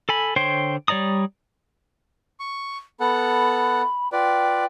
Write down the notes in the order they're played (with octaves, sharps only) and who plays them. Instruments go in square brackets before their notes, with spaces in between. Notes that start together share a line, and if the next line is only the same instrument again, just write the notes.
[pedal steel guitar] A4 G#5 B5
D3 C5 C#5 G5 C6
G3 C#5 D5 A#5 D#6
[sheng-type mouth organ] C#6
[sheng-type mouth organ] B3 A4 F#5 [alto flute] B5
[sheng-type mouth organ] F4 B4 D5 [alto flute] G5